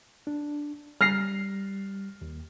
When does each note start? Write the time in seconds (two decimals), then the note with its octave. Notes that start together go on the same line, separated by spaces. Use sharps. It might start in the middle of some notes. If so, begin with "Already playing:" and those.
0.27 D4
1.01 G3 F6 A#6 C7
2.21 D#2